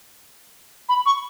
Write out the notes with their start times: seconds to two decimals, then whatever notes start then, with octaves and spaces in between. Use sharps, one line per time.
0.89 B5
1.06 C#6